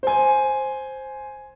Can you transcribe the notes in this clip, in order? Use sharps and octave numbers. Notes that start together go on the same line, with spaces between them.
C5 G#5